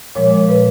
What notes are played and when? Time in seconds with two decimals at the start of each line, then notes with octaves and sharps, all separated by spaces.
0.15 A#2 F3 G#3 C#5
0.49 B4